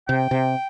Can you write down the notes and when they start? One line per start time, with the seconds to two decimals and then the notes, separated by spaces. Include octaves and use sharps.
0.08 C3 G5
0.31 C3